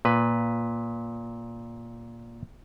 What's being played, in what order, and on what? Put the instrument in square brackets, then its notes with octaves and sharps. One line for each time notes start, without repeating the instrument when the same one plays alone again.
[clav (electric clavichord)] A#2 B4